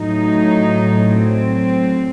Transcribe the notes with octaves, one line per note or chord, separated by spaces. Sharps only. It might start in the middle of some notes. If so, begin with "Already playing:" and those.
Already playing: A2 F#3 D#4
C4